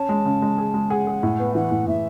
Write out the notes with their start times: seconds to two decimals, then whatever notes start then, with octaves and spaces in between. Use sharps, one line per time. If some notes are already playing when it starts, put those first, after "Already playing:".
Already playing: C#4 A5
0.09 G#3
0.25 C#3
0.42 G#3
0.58 G#4
0.74 G#3
0.90 G#4 F#5
1.07 G#4
1.23 A2
1.39 B3
1.55 E3 F#5
1.71 A2
1.87 A2 E5